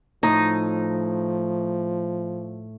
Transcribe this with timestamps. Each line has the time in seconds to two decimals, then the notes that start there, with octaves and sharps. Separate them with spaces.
0.23 A2 F3 D#4